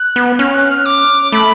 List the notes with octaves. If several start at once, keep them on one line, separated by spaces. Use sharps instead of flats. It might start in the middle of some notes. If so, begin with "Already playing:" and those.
Already playing: F#6
B3
C#4 F6
F#6
F6
D6
A3 B5